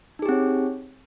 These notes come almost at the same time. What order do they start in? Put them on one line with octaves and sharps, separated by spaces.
D#4 G#4 G4 C4 C#5